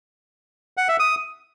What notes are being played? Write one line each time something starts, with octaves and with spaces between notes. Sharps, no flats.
F#5
E5
D#6